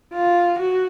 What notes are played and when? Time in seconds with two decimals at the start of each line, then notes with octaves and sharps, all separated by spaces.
0.13 F4
0.59 F#4